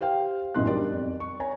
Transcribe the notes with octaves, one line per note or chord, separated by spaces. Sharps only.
G4 C5 F5 G5
A1 F#2 B2 D#4 C6 F#6
G3 D4 A#4 D5
F2
C#6
C#5 G#5 A#5